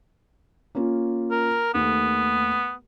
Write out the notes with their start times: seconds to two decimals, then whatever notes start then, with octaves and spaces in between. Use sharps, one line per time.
0.75 A#3 C#4 F4
1.31 A#4
1.74 D#2 A3 B3